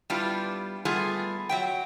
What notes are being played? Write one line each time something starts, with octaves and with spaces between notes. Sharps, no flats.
G3 B3 D4 E4 F4 G4
G3 A3 B3 F4 G#4
F#3 E5 G5